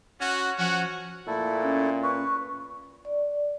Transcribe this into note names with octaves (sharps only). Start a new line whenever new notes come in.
C#4 F#4
F3 C#4 F#4 F#5
A#2 A3 E4 A4
C#4
B4 C#6
D5